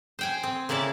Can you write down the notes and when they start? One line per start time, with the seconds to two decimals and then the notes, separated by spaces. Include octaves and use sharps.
0.19 C5 G5 G#5
0.43 C4
0.69 C#3 A#3 E4 D5 A5